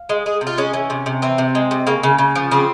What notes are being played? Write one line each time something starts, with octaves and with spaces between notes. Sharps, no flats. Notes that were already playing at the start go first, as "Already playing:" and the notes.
Already playing: F5
G#3
G#3 G#4
C3
F4
G#3 C#4
E3
C3
C3
E3 C4
C3
G#3
C3
C#3 A#3
C#3
C#3
F3
C#3 C4